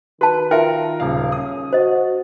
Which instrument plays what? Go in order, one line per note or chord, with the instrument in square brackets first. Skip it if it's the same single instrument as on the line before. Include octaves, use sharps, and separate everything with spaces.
[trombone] D#3 [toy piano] F#4 A5 [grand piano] B4
[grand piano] F4 A#4 [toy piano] E5 G5
[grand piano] D#1 C#3 F5
[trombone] C#4 [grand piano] D#6
[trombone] F#4 [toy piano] C5 D#5